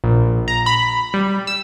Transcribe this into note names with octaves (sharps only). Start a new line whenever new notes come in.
A#1
A#5
B5
G3
E6